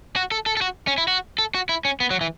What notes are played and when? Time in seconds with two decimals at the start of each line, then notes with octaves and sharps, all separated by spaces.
0.16 F#4
0.31 A4
0.46 A4
0.57 A4
0.62 F#4
0.87 C#4
0.98 E4
1.08 F#4
1.38 A4
1.55 F#4
1.69 E4
1.85 C#4
2.00 B3
2.11 F#3
2.21 E3